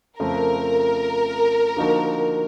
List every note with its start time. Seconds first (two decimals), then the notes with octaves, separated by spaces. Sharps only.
0.19 F2 C#3 F3 A3 A#4
1.77 D3 F3 A#3 D#4 F#4